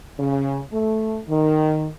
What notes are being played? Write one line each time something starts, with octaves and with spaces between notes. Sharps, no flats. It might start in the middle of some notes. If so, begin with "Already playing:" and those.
C#3
A3
D#3